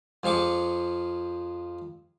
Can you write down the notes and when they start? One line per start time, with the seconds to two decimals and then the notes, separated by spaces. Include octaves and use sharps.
0.23 F2 F3 G#4 C#6 D6